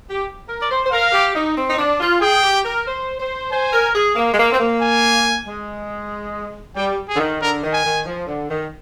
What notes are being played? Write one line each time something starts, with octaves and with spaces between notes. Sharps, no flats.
G4
A#4
D5
C5
C5
A#4 F5
G4
D#4
C4
D#4
D4
F4
G#4 G5
G4
A#4
C5
C5
C5 G#5
A#4
G#4
A#3
G#3
A#3
C4
A#3
G#5
G#3
G3 G5
G#4
D3
D#3
D3 A#4
D#3
G#5
D#3
F3
D3
D#3